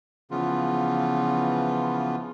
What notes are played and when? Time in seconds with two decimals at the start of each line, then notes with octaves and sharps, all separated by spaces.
0.31 C#3 E3 F3 B3 F4